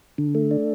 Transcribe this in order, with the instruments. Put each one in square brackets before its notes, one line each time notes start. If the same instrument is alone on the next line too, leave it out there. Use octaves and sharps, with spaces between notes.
[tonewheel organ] D3
A3
D4